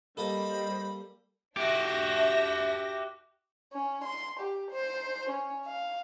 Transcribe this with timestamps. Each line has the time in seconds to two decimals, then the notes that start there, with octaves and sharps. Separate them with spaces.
0.17 G3 A#3 A4 C5 D#5 B5
1.57 D4 F#4 G4 E5 A#6
3.73 C#4
4.04 C6
4.39 G4
4.71 C5
5.31 C#4
5.66 F5